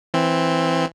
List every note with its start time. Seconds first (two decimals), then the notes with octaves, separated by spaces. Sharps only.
0.14 E3 C4